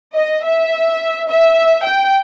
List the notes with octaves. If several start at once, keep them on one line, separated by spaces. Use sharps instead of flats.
D#5
E5
E5
G5